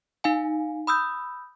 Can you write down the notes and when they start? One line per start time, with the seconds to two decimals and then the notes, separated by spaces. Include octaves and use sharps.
0.24 D#4 F5 G#5
0.87 B5 D#6 E6 G6